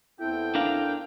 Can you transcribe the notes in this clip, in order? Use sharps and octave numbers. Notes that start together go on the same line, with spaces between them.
E2 C4 E4 A4 G5
D4 A#4 F5